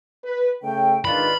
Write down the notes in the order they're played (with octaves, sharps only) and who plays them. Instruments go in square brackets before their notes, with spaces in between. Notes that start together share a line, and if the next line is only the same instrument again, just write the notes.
[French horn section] B4
[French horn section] C#3 A3 [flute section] G5
[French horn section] G#2 D#3 D4 [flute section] F4 B4 D5 [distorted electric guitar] B5